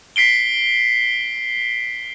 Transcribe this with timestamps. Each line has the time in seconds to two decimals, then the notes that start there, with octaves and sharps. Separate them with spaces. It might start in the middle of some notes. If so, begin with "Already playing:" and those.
0.16 B6 C7 D7 G7